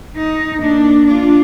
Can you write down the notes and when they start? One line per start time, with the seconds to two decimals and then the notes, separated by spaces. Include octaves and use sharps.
0.16 D#4
0.61 A#3 D4
1.07 D4 F4